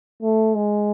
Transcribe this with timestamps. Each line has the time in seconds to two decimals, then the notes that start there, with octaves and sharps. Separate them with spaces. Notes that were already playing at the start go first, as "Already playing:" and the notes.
0.22 A3
0.55 G#3